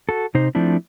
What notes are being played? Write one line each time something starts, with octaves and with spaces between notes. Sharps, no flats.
F#4 A4
C3 D#4 C5
F3 A3 C4 D4 E4